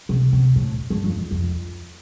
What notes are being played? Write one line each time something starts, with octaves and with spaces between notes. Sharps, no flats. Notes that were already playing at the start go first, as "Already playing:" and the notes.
C3
C3
A2
G2
F2
E2
F2